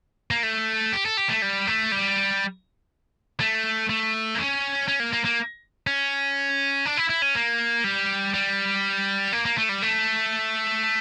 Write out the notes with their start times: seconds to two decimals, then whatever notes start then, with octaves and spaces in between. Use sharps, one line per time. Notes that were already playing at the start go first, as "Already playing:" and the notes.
0.31 A#3
0.43 A3
0.93 G4
1.06 A4
1.17 G4
1.29 A3
1.42 G3
1.67 A3
1.92 G3
3.40 A3
3.90 A3
4.35 A#3
4.38 C#4
4.88 C#4
5.00 A#3
5.13 A#3
5.25 A#3
5.87 C#4
6.86 D4
6.97 E4
7.10 E4
7.22 C#4
7.35 A#3
7.84 G3
8.34 G3
9.33 A#3
9.45 A#3
9.58 A3
9.69 G3
9.82 A3